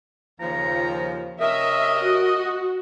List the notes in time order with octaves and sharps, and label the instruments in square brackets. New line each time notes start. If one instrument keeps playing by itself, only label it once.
[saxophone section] D#2 C#3 F3 [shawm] A#5
[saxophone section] C3 C#4 A#4 [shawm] D#5 [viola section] E5
[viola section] F#4